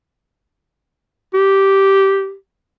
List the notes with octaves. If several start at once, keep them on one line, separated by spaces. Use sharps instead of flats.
G4